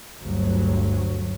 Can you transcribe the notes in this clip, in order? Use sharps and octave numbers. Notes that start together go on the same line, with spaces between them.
G1 D2 F#3